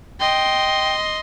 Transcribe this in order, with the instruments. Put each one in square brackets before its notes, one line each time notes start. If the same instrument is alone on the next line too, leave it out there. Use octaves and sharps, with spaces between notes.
[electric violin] D#5 C6 [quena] G5